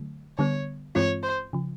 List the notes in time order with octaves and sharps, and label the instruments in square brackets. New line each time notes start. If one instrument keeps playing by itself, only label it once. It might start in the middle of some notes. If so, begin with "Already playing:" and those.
Already playing: [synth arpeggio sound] D3 F#3 A3
[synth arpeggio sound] D3 G3 B3 [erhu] C#5
[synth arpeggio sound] G2 E3 G#3 C4 F4 [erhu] C#5
[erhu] C5
[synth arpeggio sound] C#3 F3